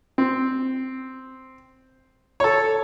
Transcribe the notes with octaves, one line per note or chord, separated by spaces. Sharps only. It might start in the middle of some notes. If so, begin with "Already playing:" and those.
C4
A4 C#5